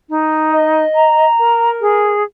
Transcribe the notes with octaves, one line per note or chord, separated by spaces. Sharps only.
D#4
D#5
A#5
A#4
G#4